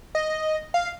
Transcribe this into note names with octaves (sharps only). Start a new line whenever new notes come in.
D#5
F5